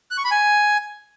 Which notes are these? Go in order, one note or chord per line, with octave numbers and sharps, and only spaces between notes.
F#6
C#6
B5
G#5